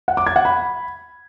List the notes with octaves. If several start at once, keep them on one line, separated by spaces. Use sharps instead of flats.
F#5
D6
G#6
F#5
B5